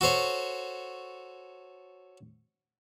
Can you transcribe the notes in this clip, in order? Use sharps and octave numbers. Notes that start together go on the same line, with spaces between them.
F#4 A4 C5 C#5